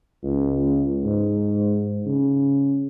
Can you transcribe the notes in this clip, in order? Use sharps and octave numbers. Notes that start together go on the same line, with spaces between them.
C#2
G#2
C#3